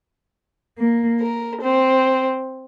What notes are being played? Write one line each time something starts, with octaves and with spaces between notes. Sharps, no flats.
A#3
A#4
C4